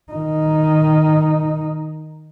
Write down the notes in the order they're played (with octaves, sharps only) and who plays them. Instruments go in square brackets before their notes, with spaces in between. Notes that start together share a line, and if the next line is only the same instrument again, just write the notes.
[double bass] D#3 D#4